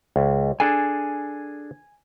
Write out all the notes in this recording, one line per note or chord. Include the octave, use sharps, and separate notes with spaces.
C#2
D4 G#4 A4 G#5